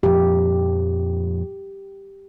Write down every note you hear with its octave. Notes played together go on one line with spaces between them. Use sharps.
F2 A#2 F3 G4